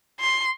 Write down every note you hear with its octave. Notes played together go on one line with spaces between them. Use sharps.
C6